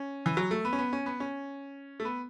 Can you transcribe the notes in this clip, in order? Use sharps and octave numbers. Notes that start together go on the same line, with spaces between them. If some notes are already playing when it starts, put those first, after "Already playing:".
Already playing: C#4
E3
F#3
A3
B3
C#4
B3
C#4
B3
C#4
A3
B3